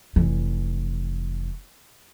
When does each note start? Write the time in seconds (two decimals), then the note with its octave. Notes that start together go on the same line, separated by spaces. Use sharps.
0.16 F1 E3